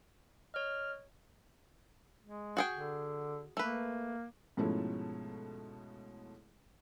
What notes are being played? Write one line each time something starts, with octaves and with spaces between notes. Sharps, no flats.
C#5 D#5 F6
G#3
F#4 G#4 G5
D3
A3 A#3 B4
G#2 B2 F3 A3 C#4 E4